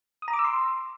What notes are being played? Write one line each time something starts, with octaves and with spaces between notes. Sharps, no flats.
D#6
A#5
D6
E6
C6